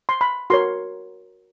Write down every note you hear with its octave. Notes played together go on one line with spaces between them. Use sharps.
C6
B5
F#4 A#4 C#5 C6